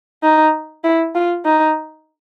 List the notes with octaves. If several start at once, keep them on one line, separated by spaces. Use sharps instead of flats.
D#4
E4
F4
D#4